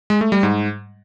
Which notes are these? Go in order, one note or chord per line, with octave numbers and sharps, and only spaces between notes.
G#3
A3
G3
G#2